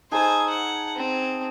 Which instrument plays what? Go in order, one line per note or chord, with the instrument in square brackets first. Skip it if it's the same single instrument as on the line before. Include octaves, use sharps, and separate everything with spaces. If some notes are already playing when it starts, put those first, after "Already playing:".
[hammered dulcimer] D#4 G#4 A4 [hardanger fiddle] C5 G#5
[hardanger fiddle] F#5
C4